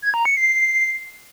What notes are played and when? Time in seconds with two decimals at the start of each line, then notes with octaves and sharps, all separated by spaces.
0.02 G#6
0.14 A#5
0.25 C#7
0.37 C7